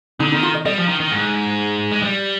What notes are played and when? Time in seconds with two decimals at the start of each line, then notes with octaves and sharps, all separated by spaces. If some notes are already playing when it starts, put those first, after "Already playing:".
0.20 D3 D#4
0.32 D#4
0.35 D#3
0.43 F4
0.54 D#5
0.65 G3 D#5
0.77 F3
0.89 D#3
1.00 D#3
1.11 G#2
1.92 G#3
2.02 G3